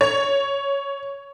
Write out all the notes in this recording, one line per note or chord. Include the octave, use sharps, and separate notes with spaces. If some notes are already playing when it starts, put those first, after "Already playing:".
C#5